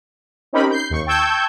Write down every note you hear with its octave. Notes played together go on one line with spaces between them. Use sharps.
C4 C#4 D#4 G4 A#4 B5
G6 C7
D#2 C#6
G5 A5 C#6 E6 G6 G#6